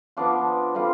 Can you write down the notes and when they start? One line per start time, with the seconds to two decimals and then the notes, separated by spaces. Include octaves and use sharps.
0.17 F3 B3 D4 F4
0.74 D3 G3 C4 F4